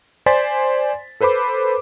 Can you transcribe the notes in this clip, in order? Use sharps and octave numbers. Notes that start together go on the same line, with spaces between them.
C5 D5 G#5 C6 A6 B6
A4 B4 C5 B5 D6